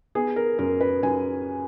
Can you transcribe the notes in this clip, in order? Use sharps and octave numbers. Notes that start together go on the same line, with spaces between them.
B3 G#4
A#4
F#2 A#4
B4
F#2 G#5